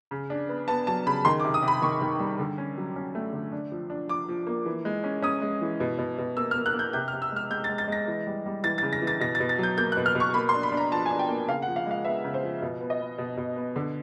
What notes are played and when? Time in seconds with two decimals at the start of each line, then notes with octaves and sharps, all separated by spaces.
0.11 C#3
0.30 D4
0.49 B3
0.68 B3 A5
0.87 F#3 A5
1.06 C#3 B5
1.25 D#3 C6
1.40 D6
1.44 C3
1.54 D#6
1.62 C3
1.68 B5
1.82 D#3 C#6
2.02 D#3
2.19 G3
2.39 D3
2.58 C#4
2.77 F#3
2.96 C#4
3.15 A3
3.33 D3
3.52 D4
3.72 F3
3.90 D4
4.09 F3 D6
4.29 F3
4.47 A#3
4.66 E3
4.85 G#3
5.04 C#4
5.22 C#4 D#6
5.42 G#3
5.61 E3
5.80 B2
5.99 B2
6.18 B2
6.37 A#3 E6
6.51 F6
6.56 A#3
6.66 F#6
6.74 A#3
6.79 G6
6.93 C3 G6
7.08 F6
7.13 C3
7.22 E6
7.32 G#3 F6
7.50 G#3 G6
7.64 A6
7.69 G#3
7.78 A6
7.88 G#3 A#6
8.08 E3
8.27 G3
8.46 G3
8.64 E3 A6
8.78 A6
8.82 C#3
8.93 A#6
9.02 E3
9.07 A6
9.20 B2 A#6
9.35 A6
9.40 B2
9.49 A6
9.58 F#3
9.63 G6
9.77 A#3 G6
9.92 F#6
9.97 B2
10.06 F6
10.15 B2
10.20 C#6
10.34 A#3 B5
10.49 C6
10.54 D4
10.63 B5
10.72 D4
10.77 A#5
10.92 F3 A5
11.06 G#5
11.11 D4
11.19 G5
11.29 A#3
11.48 C#3 F5
11.62 F#5
11.68 F3
11.76 F5
11.86 G#3 F5
12.04 B3 E5
12.24 C#3
12.34 C5
12.43 F3
12.62 B2
12.81 B3
12.90 D#5
13.00 B3
13.18 B2
13.37 B2
13.56 B3
13.76 D3